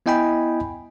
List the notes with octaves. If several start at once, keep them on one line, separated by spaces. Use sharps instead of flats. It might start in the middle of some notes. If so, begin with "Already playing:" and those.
B3 E4 D#5 G5 G#5 B5